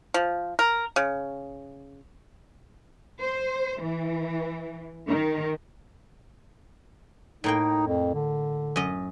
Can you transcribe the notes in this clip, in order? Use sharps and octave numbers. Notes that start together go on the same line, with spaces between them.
F3
A#4
C#3
C5
E3
D#3
A2 A#3 D#4 G5
F2
D3
F#2 D#5